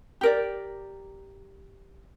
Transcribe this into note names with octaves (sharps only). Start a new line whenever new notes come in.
G4 A#4 D5